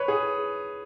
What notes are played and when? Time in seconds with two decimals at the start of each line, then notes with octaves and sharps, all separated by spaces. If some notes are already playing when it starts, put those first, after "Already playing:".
Already playing: B4 C#5
0.08 G#4